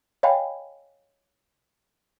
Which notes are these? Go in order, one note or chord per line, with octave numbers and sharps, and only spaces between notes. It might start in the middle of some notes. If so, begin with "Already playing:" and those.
C#5 D#5 F5 G5 G#5 B5